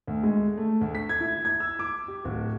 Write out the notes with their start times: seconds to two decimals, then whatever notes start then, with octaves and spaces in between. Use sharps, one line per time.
0.08 D2
0.23 G#3
0.57 A3
0.81 D2
0.95 B6
1.09 G#6
1.21 E4
1.45 G#6
1.60 E6
1.79 D6
2.08 G4
2.25 D1